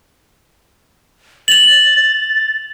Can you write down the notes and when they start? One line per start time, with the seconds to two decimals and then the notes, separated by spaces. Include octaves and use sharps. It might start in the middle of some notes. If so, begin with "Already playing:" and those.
1.48 A6 F7 F#7